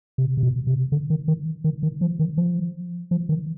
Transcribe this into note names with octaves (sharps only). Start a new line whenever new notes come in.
C3
C3
B2
C3
D3
D#3
D#3
D#3
D#3
F3
D#3
F3
F3
D#3